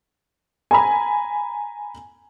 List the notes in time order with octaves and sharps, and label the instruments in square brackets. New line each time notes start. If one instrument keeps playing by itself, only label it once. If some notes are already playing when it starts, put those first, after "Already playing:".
[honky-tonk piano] G#5 A#5 B5